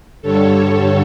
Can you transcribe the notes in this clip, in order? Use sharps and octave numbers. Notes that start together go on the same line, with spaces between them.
G2 D3 G3 A4 C#5